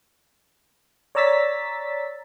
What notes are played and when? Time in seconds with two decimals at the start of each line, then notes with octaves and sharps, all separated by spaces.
1.15 C#5 D5 A#5 E6 A6 B6